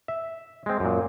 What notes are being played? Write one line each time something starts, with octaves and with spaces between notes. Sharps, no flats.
E5
G#3 C4
F#2 A#2